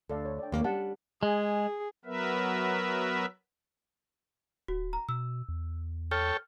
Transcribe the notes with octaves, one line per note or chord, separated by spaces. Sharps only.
D2 A4 D5 F5
C#5
D5 G5
D#2 A#3
G3 C#4 F#5 A5
G#3 G#4
F#3 B3 A#4 B4 E5
D1 F#4
A#5
B2 E6
E2
A4 C#5 G5 F6